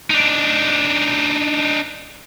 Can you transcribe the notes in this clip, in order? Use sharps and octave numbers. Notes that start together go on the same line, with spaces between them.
D4 D#4